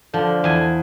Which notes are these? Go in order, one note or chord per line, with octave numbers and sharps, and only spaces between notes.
D3 F3
E2 G#5